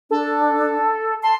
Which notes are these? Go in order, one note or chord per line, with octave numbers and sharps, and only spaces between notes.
D4 A4
A5 C6